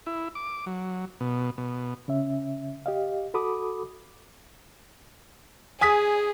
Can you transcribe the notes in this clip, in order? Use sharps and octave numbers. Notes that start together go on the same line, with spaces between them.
E4
D6
F#3
B2
B2
C#3 C#4 E5
G4 D#5 F5
F#4 A4 B5 D6 D#6
G#4 G#5 D#6 B6